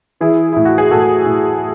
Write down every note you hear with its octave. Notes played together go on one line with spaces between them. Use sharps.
E3 E4 G#4
A2 E4
F#4
G#4
A2 F#4 A4
A2